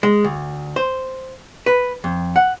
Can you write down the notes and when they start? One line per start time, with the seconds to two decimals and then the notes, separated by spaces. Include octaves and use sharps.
0.03 G#3
0.24 D2
0.76 C5
1.66 B4
2.04 F2
2.36 F#5